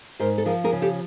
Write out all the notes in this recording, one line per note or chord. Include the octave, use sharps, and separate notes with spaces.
G#2 A#4 C5
A4
F3 G#4 A#4
G#4 A#4
C#3
G4 A4